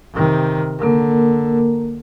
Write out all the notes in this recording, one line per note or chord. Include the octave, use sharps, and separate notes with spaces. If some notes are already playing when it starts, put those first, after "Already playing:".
C3 D#3
D3 A#3 A#4